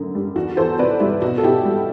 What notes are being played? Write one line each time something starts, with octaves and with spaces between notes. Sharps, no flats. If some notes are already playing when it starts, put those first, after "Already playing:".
Already playing: F#2 D3 A3
G3
E2 F#4
E2 A4 C5
C3 B4 D5
G3 E4
B2 F#4
A4
B2 E4 G4
G3